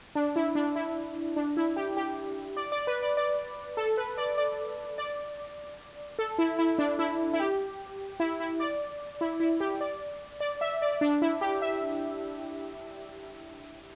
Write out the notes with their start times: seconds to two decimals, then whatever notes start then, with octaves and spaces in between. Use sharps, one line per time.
0.15 D4
0.36 E4
0.55 D4
0.76 E4
1.36 D4
1.57 E4
1.76 G4
1.97 G4
2.57 D5
2.72 D5
2.87 B4
3.02 D5
3.17 D5
3.77 A4
3.97 B4
4.18 D5
4.38 D5
4.98 D5
6.19 A4
6.39 E4
6.59 E4
6.78 D4
6.99 E4
7.34 E4
7.40 G4
8.20 E4
8.40 E4
8.60 D5
9.21 E4
9.40 E4
9.60 G4
9.81 D5
10.40 D5
10.61 E5
10.82 D5
11.01 D4
11.22 E4
11.41 G4
11.62 E5